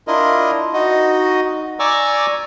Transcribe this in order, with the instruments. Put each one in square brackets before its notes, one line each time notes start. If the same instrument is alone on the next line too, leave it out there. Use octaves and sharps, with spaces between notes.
[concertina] D4 E4 F4 A#4 D#5
D#4 F#4 D#5
D5 G#5 A#5 C#6 D6 E6